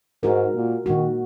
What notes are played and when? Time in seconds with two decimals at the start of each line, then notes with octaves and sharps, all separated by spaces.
0.23 G#2 G#3 F#4 A#4
0.55 A#2
0.86 A#2 D#3 G#3 F#4